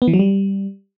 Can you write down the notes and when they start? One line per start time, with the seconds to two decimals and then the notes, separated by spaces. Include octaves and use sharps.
0.02 B3
0.08 E3
0.14 F#3
0.19 G3